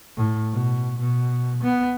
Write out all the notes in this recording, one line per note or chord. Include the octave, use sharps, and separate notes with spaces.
A2
B2
B2
B3